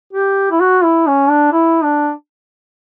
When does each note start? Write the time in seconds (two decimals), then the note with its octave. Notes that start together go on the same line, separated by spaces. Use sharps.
0.13 G4
0.51 E4
0.60 F#4
0.84 E4
1.07 C#4
1.29 D4
1.53 E4
1.83 D4